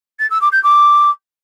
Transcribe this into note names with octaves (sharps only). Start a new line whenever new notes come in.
A6
E6
D6
G6
D6